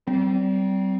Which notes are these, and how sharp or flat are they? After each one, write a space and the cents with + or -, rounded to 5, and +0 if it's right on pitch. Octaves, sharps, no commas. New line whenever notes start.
G3 -35 C4 -15